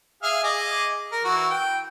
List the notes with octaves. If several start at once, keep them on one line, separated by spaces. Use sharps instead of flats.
G#4 E5 F5
G#4 D#5 D6
A#4
E3 F#4
G5